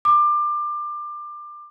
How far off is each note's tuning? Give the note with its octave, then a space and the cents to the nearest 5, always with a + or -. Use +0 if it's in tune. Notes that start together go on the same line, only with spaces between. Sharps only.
D6 +25